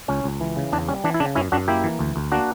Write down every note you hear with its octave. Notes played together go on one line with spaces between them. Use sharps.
C#2 C#4
C#2
E3
C#3
E2 D4
G3 C#4
E3 D4
E4
C#3 D4
F#2 C#4 E4
F#2 D4 F#4
A#3 E4 G4
E3
D2
D2
A#3 D4 F#4